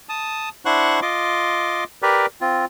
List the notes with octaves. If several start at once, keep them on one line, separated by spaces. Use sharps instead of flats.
A5 D#6
D4 E4 C5 F#5 C#6 F#6
F4 D#5 C6 D6
G4 A#4 B4 D5
C4 F4